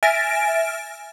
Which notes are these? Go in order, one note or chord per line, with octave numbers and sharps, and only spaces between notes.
E5 G#5 F6 A6 A#6 D7